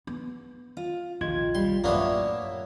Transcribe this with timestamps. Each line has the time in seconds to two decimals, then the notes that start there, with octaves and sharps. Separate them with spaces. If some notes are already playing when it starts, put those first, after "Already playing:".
0.07 B3
0.77 F4
1.21 A#1 D#2 C3 D#3 F4 G#6
1.55 G3 C6
1.84 F#2 A2 A#3 B3 D4 C#5 E5